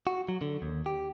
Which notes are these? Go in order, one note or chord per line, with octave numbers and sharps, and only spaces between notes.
F#4
F#3
D3
D#2
G4